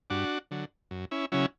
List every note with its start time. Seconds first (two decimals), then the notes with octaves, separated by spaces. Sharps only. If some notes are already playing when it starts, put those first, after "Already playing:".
0.10 G2 D4 F#4
0.51 D3 F#3
0.91 F#2
1.11 C#4 E4
1.32 C#3 F#3 C#4 E4